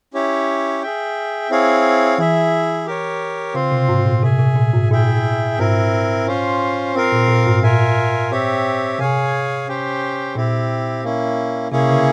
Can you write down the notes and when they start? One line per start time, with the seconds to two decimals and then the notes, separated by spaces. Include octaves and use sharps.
0.14 C#4 E4 G4 C#5
0.82 G#4 E5 G5
1.50 C4 E4 G#4 C#5 F5
2.18 E3 E4 G#4 E5
2.86 G4 A#4 C#5
3.54 C#3 C4 F4 C5
3.72 C3
3.89 G#2
4.05 A#2
4.23 C3 G#4 E5 G#5
4.39 C3
4.56 A#2
4.74 G#2
4.91 A#2 E4 G#4 E5 G5
5.58 G#2 C4 E4 A#4
6.27 C#4 F4 C5
6.94 C4 F4 A#4 F5
7.12 A#2
7.28 A#2
7.47 G#2
7.63 A#2 F4 A#4 E5 G#5
8.31 C4 G4 C#5 E5
8.99 C3 G#4 C#5 F5 G#5
9.68 C#4 G4 C5 G5
10.35 A#2 C4 E4 G4
11.03 A#3 C#4 E4
11.72 C3 A#3 C#4 E4 G#4 C#5
11.89 C#3